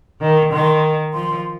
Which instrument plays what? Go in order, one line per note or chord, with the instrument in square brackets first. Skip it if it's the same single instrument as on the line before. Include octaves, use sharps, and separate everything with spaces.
[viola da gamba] D#3
[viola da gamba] D#3 [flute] C6
[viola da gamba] F3 [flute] C6